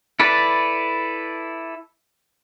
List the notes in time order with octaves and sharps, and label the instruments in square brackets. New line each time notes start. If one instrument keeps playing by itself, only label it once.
[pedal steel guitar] E4 A4 B4 D5